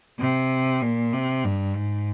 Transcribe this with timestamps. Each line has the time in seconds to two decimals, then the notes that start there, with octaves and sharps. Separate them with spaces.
0.19 C3
0.82 A#2
1.13 C3
1.44 G2
1.76 G#2